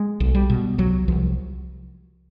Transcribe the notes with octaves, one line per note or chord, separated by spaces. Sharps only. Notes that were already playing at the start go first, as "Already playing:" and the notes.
Already playing: G#3
B1
G3
B2
C2 F#3
C2 F3